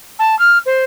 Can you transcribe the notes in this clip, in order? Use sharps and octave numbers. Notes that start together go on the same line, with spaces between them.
A5
F6
C5